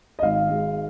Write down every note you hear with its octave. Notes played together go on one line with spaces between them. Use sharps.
D#5
G#1 F5
G#3